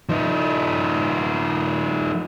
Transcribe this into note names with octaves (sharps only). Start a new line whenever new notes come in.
F3 D#4